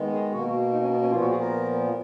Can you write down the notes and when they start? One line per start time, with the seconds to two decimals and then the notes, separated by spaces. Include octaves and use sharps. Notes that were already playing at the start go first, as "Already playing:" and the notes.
Already playing: D#3 G#3 B3
0.13 G#4
0.33 B2 A#3 F#4
0.73 D#4
0.82 C#4
0.91 B3
1.01 C#4
1.11 A#2 F3 B3 F4
1.21 F#4
1.31 G#4
1.41 A#4